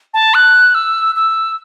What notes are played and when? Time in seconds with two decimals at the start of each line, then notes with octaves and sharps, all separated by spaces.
0.14 A5
0.34 F#6
0.75 E6
1.16 E6